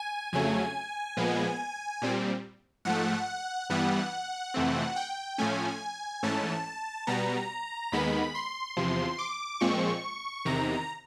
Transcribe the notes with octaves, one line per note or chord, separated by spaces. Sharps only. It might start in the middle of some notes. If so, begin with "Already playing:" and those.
Already playing: G#5
F2 C#3 F#3 A3 G#5
A#2 F3 G#3 B3
A#2 G3 C4
G#2 F3 A3 F#5
G2 E3 G3 B3 F#5
F2 C3 E3 A3 C4
G5
A2 F3 A3 C#4 G#5
G#2 E3 A3 C#4 A5
B2 G3 B3 A#5
D#2 D#3 G#3 B3 B5
C6
E2 C3 F3
D6
A#2 F3 G#3 C4 C#6
E2 C3 D#3 A#5